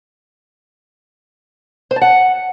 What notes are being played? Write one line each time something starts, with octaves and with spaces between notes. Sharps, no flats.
C5
A5
F#5